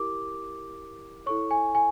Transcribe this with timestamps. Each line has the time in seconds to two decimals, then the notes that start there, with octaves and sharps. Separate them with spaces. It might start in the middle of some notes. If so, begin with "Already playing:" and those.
Already playing: E4 G4 A#4 D6
1.26 E4 A4 C#5 C#6
1.51 G#5
1.75 G#5